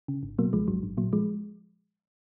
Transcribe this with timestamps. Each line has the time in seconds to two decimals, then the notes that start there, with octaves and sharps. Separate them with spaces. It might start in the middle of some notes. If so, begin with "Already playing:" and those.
0.08 C#3
0.23 G#1
0.38 B2 F#3 A#3
0.52 C#2 F3 G#3
0.68 G#1 F#3
0.83 G#1
0.97 A#2 F#3
1.13 F3 G#3